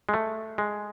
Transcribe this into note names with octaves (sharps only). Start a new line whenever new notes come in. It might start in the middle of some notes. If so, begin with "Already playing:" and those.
G#3
A3
G#3